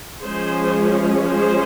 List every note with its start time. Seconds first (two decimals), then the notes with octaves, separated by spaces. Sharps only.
0.22 F3 G#3 C#4 G#4 C5
1.30 G#4 C5